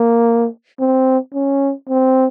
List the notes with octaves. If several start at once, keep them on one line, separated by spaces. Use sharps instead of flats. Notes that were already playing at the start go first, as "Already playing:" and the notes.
Already playing: A#3
C4
C#4
C4